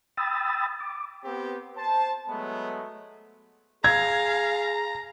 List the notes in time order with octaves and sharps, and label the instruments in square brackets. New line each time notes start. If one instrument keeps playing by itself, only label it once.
[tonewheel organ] G5 B5 D#6 E6 A6
D6
[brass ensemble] B3 C4 G4
C5 A5
F#3 G#3 A3 B3
[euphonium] G#4 [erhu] F5 [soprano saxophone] A#5 [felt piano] G#6